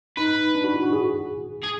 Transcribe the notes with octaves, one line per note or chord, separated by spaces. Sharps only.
D#4 B4
D4
F#4
E4
F#4
G#4
G#4